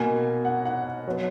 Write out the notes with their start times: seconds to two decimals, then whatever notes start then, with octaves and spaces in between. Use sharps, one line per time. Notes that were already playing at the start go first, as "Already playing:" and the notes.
Already playing: B2 A#3 G#5
0.45 F#5
0.65 F#5
1.07 F#3 B3